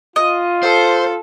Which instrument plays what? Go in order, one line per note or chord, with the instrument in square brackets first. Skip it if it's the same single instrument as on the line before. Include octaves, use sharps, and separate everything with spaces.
[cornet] F4 [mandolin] D#5
[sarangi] A4 [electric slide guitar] C5